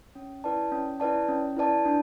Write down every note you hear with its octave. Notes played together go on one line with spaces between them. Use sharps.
C#4
E4 B4 D5 A5
C#4
E4 B4 D5 A5
C#4
E4 B4 D5 A5
D4